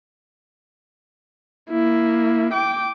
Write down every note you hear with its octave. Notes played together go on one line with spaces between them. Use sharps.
A#3 E4
G5 D6